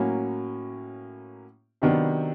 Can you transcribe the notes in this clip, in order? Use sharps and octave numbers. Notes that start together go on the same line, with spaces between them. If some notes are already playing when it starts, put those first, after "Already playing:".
Already playing: A2 F#3 A#3 C#4 F#4
C3 D#3 F#3 B3 D4